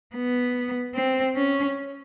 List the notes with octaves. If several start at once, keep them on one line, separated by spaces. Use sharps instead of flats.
B3
C4
C#4